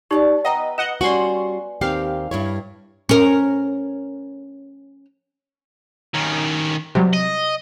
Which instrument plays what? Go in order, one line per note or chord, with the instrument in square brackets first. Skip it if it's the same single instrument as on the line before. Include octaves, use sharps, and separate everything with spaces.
[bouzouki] G3 D4 A5 [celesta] D#4 G4 C#6
[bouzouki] B3 B4 E5 [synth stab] D#5 [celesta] F#5 G5 A#5
[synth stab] D#5 F#5 [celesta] E7 G7
[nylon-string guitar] G3 C#4 F#4 [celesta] D5 G#5 F#7 [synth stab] C6 C#6
[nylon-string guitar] D#2 C4 G4 [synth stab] F5
[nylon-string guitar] G2 E4 C#5
[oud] C#4 A#4
[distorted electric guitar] D#3 C#4
[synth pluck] C3 F#3 G3
[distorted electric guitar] D#5